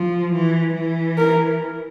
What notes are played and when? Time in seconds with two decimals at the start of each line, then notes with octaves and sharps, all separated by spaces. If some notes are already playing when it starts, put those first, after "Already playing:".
Already playing: F3
0.33 E3
0.75 E3
1.18 A#4